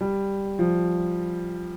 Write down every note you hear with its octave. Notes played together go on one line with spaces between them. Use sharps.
G3
F3